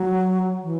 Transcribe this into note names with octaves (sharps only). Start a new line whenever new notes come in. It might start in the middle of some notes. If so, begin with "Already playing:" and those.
Already playing: F#3
E3